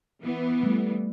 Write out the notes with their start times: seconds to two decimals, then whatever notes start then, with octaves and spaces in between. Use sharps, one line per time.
0.22 E3 B3
0.63 G3 A3